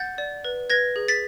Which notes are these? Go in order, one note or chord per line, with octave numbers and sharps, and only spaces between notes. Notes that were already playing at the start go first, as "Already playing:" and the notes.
Already playing: F#5 G6 A6
D5
B4
B4 G#6 A#6
G#4
A6 B6